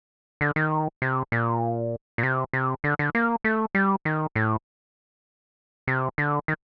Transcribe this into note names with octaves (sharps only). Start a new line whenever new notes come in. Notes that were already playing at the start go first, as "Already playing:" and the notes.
D3
D#3
C3
A#2
A#2
C3
C3
D3
D3
A#3
A3
G3
D#3
A2
C3
D3
D#3